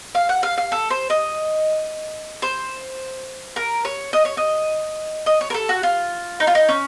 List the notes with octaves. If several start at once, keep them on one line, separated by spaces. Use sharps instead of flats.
F5
F#5
F5
F5
A4
C5
D#5
C5
A#4
C#5
D#5
C#5
D#5
D#5
C#5
A#4
A4
F#4
F4
D#4
F4
D#4
C#4